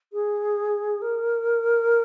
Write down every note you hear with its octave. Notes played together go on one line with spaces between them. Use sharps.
G#4
A#4